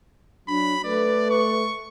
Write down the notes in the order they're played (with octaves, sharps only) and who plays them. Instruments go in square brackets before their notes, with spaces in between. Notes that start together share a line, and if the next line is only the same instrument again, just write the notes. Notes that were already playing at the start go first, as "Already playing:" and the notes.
[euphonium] F#3 [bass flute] D4 [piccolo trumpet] B5
[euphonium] A3 [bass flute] B4 [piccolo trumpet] D5
[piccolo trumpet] C#6